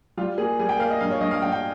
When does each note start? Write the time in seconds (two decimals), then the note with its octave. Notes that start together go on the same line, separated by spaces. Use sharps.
0.17 G3 F4
0.38 A#3 G#4
0.59 G3 G#4
0.69 G5
0.79 A#3 F5
0.90 D#5
1.01 G2 F5
1.11 C#5
1.21 G2 D#5
1.31 F5
1.42 G2 G5
1.52 G5